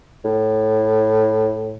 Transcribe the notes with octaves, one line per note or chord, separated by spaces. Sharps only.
A2